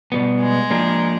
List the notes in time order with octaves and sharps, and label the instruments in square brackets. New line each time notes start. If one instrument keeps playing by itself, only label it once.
[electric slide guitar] B2 G3 B3
[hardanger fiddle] G#3
[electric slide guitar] F3 A#3 D4 G4 A#4